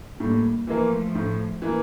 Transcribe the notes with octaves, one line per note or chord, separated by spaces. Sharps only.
A2 G3 A#3
E3 F3 A3 A#3
A2
E3 A#3